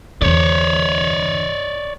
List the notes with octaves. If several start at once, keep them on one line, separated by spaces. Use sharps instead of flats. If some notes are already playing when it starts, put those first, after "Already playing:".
E2 D3 C#5 D5